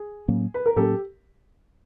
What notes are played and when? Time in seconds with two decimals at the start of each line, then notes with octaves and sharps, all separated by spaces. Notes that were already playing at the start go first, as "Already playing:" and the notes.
Already playing: G#4
0.28 A2 F#3 A#3 C#4
0.54 B4
0.66 A#4
0.76 A2 F#3 A#3 C#4 G4 A4